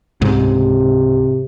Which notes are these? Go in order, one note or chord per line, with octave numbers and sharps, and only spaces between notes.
C#2 G#2 C3